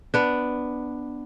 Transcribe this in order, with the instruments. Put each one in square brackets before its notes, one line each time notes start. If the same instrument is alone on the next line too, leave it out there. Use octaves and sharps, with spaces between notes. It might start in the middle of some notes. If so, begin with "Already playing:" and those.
[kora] B3 D4